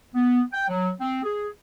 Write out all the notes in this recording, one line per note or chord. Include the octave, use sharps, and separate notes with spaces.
B3
G5
F#3
C4
G#4